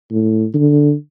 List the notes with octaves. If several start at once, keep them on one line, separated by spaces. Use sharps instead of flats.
A2
D3